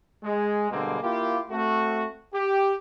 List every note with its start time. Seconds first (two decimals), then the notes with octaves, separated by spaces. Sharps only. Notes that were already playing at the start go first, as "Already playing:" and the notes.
0.23 G#3
0.71 B2 D3 G3 G#3 A#3 C4
1.02 A#3 E4 F4 G4
1.50 A3 C4 F#4
2.33 G4